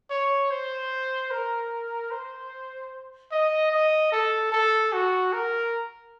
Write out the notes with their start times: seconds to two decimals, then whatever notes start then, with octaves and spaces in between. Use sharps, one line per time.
0.10 C#5
0.51 C5
1.31 A#4
2.11 C5
3.32 D#5
3.72 D#5
4.12 A4
4.52 A4
4.93 F#4
5.33 A#4